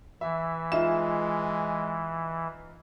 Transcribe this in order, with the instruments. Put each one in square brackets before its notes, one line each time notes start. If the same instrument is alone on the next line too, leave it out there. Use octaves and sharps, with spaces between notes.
[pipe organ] E3 [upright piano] E5
[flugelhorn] G#3 [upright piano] D#4 F4 [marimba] E5